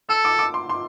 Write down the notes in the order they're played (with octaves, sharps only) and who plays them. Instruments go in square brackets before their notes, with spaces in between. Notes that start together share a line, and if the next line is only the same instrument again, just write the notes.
[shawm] A4 [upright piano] E6
[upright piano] D6
D6
C6
C6